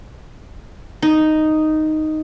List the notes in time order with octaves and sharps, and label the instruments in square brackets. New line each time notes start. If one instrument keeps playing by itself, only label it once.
[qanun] D#4